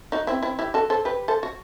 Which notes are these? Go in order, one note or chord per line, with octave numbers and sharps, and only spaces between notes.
D#4 F#4
C4 E4
C4 E4
E4 G4
F#4 A4
A4 C5
G4 B4
A4 C5
F#4